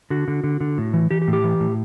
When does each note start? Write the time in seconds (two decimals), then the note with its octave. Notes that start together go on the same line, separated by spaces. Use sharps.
0.10 D3 F#4
0.28 D3
0.44 D3
0.61 D3
0.78 A2
0.94 E3
1.11 E3 G4
1.22 G4
1.28 A2
1.33 G4
1.44 E3
1.60 A2